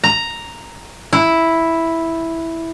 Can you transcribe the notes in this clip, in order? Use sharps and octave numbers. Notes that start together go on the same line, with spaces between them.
A#5
E4